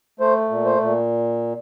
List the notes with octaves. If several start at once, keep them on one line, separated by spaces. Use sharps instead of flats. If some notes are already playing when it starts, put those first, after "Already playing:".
A3 C5
A#2
C5
A#2